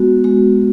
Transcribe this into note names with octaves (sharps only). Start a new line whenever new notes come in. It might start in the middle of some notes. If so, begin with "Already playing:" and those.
Already playing: G#3 B3 F#4
G#3